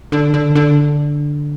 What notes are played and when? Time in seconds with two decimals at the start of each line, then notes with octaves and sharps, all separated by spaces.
0.12 D3
0.34 D3
0.55 D3